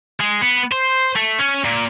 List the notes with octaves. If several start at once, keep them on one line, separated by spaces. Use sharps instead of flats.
G#3
B3
C5
A3
C#4
A#2